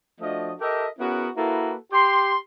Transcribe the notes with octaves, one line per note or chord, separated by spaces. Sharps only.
F3 A3 D4 F#4 D#5
G4 A4 A#4 D#5 E5
B3 C#4 E4 F#4 G#4 A#4
A#3 E4 F#4 A4 B4
G4 C6